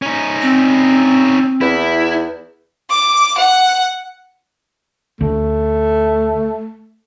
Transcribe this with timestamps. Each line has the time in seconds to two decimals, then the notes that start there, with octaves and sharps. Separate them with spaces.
0.02 C#4 D#4
0.42 C4
1.61 E2 E4
2.89 D6
3.37 F#5
5.21 D2 A3